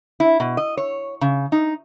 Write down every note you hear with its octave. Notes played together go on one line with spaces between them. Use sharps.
E4
B2
D#5
C#5
C#3
D#4